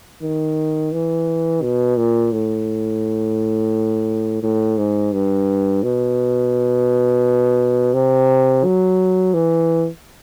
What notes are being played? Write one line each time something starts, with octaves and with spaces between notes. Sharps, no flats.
D#3
E3
B2
A#2
A2
A2
G#2
G2
B2
C3
F#3
E3